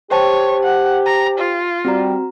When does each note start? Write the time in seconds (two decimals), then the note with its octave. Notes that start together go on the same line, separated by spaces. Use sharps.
0.11 G4 C5 C#5 G5 A5
0.64 F#5
1.06 A#5
1.39 F4
1.85 G3 C4 F#4 A#5